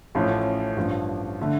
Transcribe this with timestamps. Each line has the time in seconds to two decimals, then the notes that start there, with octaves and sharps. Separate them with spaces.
0.15 A1 A2 F3 A3 C#4
0.76 A1 G2 F3
1.41 D3 A3